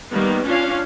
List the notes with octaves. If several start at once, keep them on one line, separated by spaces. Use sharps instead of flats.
D#3 G3 A#3 B3
C#4 D4 F4 C#5 F5